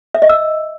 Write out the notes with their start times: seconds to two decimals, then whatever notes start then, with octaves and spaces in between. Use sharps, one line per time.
0.14 E5
0.22 D#5
0.29 E6